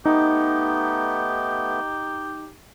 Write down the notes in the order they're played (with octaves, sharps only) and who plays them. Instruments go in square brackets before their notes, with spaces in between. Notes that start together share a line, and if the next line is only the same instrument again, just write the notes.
[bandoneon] A3 B3 [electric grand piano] D#4 [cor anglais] G4